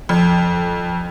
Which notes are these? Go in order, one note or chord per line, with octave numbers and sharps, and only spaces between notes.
F2